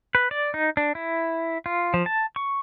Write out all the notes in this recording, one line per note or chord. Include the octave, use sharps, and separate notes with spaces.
B4
D5
D#4
D4
E4
F4
F3
A5
C#6